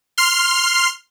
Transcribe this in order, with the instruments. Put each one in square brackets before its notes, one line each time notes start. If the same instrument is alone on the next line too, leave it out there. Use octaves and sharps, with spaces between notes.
[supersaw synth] C6 F6 C7